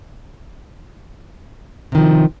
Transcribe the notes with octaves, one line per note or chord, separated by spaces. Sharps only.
C3 D#3 F3